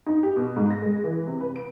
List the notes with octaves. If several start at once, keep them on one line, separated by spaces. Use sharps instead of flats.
D#4
G4
B2
G#2
A#6
G#3
E3
C3
B4
D7